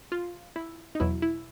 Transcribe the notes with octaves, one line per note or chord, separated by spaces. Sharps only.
F4
E4
D#4
E2 B2 F#3 E4
E4